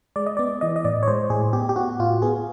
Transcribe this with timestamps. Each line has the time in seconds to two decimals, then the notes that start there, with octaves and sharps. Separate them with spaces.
0.16 G#3 D5
0.26 D#5
0.37 B3 D5
0.61 E3 D#5
0.76 D#5
0.84 A2 D5
1.03 C#5
1.08 G#3 C5
1.30 A2 G#4
1.53 B3 G4
1.69 G4
1.76 B3 F#4
1.99 A2 F4
2.22 B3 G#4